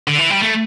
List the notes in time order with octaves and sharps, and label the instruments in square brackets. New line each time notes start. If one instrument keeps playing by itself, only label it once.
[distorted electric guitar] D3
E3
G3
A3